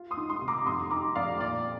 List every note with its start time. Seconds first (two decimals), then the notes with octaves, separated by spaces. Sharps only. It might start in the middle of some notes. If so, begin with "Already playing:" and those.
Already playing: F4
0.11 C6 D#6
0.17 D#3
0.30 C6 D#6
0.42 C3
0.48 A#5 D6
0.66 F2 C6 D#6
0.91 D#3 A#5 D6
1.15 F2 D5 F5
1.40 A#2 D5